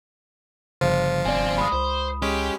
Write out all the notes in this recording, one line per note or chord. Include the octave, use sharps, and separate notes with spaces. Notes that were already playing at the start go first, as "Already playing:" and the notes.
G1 C#3 F3 F4 C5
F1 C4 D5 G#5
G#3 B5 D#6
C#2 C5
G#3 C#4 G4